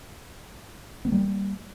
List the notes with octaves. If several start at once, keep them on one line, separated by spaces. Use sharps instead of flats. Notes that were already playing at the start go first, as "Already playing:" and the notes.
G3 A#3 B3